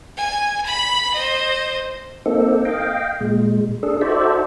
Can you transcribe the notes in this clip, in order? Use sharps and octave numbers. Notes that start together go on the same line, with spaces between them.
G#5
B5 B6
C5 D#5
A#3 C4 D#4 A4
D#5 F5 G5
A#2 G#3
D4 G#4 A4
D#4 F#4 A4 C5 D5 E5